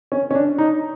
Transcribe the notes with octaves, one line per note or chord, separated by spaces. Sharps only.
C#4
C#4
D4
D#4